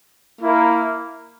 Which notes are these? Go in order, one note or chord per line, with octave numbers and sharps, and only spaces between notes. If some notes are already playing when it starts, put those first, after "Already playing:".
A#3 E4 A#4